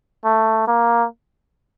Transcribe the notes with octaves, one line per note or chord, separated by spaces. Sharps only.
A3
A#3